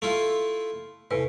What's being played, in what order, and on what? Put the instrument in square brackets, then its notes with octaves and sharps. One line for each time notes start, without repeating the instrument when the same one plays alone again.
[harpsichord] A3 E4 F4
[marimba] E2 C3 B4 [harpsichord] A2